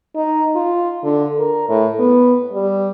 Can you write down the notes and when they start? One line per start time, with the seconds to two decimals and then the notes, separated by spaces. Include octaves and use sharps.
0.16 D#4
0.55 F4
1.04 D3
1.38 A#4
1.69 A2
1.99 B3
2.53 G3